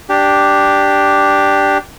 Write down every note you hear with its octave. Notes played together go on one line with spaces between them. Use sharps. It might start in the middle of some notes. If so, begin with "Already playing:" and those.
D4 G4